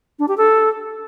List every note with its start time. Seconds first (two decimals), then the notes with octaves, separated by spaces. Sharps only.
0.19 D4
0.28 G4
0.37 A4